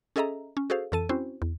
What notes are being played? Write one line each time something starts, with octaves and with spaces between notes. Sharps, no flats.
C#4 G#4 A4 D#5 E5 A#5
C#4
F#4 G#4 A4 C5 F5
F2 E3 A4 A5 D#7
C4 C#4 E4 F#4 C5
E2